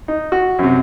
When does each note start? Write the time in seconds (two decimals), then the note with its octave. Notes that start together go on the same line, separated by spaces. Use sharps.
0.08 D#4
0.32 F#4
0.59 F#2 C3